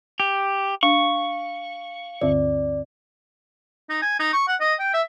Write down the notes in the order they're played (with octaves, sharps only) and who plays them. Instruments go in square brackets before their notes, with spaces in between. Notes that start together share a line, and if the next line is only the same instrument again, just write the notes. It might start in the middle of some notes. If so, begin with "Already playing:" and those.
[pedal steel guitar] G4
[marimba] D4 [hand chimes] F5 [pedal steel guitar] C#6
[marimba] D2 G2 D3 [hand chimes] D5
[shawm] D#4
G#5
D#4
C#6
F#5
D#5
G5
E5